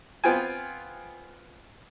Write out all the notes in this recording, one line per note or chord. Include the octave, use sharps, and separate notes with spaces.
B3 C4 F4 G5 G#5